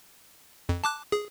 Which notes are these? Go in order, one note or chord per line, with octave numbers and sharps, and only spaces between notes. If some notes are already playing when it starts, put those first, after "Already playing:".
F2
A5 D6 F#6
G#4